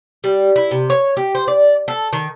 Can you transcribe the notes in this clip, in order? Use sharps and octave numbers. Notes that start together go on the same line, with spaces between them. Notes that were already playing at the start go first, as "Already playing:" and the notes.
G3
E4
C3
C#5
G4
C5
D5
A4
D#3